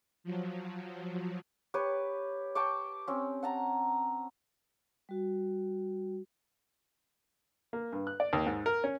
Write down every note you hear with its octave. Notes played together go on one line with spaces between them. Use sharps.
F3 F#3
G4 B4 C#5
G5 A5 C#6 D6
C4 C#4
F#5 A5 A#5
G3 F#4
A#3
G2
F#6
D5
D#2
G#2
A#4
C#4